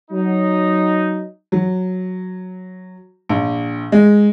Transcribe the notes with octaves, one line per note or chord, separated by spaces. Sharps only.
F#3 D#4
F#3
A#1
G#3